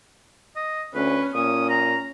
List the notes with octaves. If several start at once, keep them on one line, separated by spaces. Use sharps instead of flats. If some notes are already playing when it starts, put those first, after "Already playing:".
D#5
D2 C#4 B4
A#2 C#4 D#6
A#5